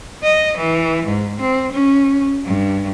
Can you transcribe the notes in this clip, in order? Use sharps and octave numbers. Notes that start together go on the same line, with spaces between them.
D#5
E3
G#2
C4
C#4
G2